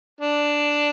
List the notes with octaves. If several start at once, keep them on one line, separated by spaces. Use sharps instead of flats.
D4